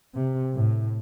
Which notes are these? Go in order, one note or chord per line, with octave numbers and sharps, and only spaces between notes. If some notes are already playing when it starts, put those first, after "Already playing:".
C3
A2